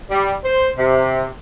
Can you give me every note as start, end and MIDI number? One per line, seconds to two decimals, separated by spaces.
0.10 0.34 55
0.44 0.70 72
0.77 1.26 48